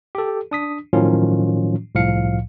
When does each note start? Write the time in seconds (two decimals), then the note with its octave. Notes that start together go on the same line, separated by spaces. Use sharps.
0.15 G4 A4
0.51 D4 D#6 B6
0.93 A2 D#3 F3 F#3 C#4 F4
1.95 C2 A2 F3 F5 C#7